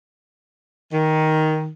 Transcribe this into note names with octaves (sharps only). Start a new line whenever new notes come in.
D#3